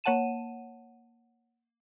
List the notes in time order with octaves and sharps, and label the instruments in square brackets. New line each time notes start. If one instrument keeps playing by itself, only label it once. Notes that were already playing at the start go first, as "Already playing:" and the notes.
[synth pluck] A#3 C#5 F#5 A5 D#7 E7